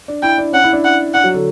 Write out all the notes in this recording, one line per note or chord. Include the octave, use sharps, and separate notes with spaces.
D4
E4 G5
D4
C#4 F#5
E4
D4
F#5
D4 F#5
F#3
D3